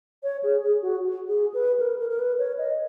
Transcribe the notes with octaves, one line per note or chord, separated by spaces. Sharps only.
C#5
G#4
G#4
F#4
G#4
B4
A#4
A#4
A#4
B4
C#5
D#5